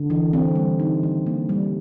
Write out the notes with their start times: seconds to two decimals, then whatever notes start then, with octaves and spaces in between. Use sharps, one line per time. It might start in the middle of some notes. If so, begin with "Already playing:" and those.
Already playing: D3
0.10 E3
0.33 C4
0.55 G3
0.80 D#4
1.03 D#3
1.27 A#3
1.49 G3